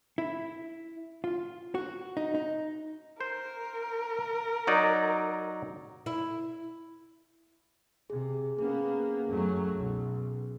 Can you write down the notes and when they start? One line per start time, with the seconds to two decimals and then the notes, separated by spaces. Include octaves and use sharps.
0.18 E4
1.24 F4
1.75 F#4
2.17 D#4
2.35 D#4
3.21 A#4 C5
4.67 F#3 D#4 D5
6.06 E4
8.10 C3 G#4
8.59 A#3 B3 C#4 G#4
9.29 F#2 F#3 A3
9.73 B1